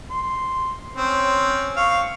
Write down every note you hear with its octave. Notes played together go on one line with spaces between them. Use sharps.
C6
C4 C#4
F5 C#6